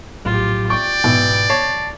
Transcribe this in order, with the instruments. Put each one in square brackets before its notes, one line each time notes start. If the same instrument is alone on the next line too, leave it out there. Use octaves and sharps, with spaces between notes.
[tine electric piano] A#1 A2 F#3 [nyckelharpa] F4 G4
[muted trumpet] D5 [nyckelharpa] G5 [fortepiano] C#6
[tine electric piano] G#2 [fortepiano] B2 E3
[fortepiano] C#5 [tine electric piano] A5 A#6 C7